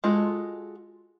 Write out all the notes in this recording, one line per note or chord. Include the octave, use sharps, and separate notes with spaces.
G#3 F4 F#4 A4